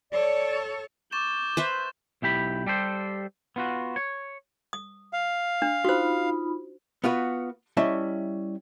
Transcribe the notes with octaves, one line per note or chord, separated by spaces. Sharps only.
A4 C#5 D5
C#6 D6 G6 A6 E7
B4 C5 E5
B1 E4 G4 B5
G3 G4 A4 C5
B3 F4 F#4
C#5
D#6
F5
D4
D#4 F4 F#4 C5 B5
B3 F4 F#4 B4
G3 C#4 E4 D#5 E5 A5